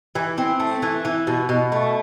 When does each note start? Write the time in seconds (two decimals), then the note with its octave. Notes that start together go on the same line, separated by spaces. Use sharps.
0.15 E3
0.38 C4
0.60 A3
0.82 E3
1.05 E3
1.27 B2
1.49 B2
1.72 A3